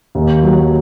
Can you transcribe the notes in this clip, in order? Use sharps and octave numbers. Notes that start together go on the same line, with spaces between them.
D#2
F#3